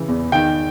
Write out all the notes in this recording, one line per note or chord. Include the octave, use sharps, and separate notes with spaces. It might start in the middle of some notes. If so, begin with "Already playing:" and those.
Already playing: C#3 E3
E2
D#3 G5